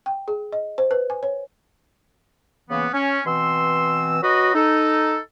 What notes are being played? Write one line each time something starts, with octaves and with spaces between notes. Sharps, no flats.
G5
G#4
D#5
C5
B4
G#5
C#5
C#3 E3 A#3 B3
C#4
B2 E3 C4 C6 E6
F#3 F#4 B4 D#5
D#4 A4